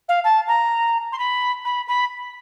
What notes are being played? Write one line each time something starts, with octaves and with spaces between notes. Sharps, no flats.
F5
A5
A#5
C6
B5
B5
B5